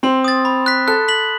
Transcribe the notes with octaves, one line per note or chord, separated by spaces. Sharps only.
C4 C6
D#6 A6
B5
F#6 B6
A4 F#6
B6 F#7